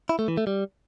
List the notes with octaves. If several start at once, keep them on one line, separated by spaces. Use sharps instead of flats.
E4
A3
E3
A3
G3